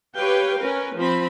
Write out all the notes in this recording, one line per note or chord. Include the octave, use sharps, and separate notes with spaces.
G4 B4 C#5 F5 G5
C#4 A#4 B4
F3 C4 B5